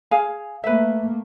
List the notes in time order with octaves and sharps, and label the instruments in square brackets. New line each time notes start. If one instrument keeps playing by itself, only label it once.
[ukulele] G#4 F5 G#5
[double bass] A3 A#3 [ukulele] B4 E5